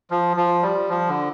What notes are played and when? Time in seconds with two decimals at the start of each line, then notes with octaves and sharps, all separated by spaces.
0.11 F3
0.37 F3
0.63 G3
0.89 F3
1.09 D3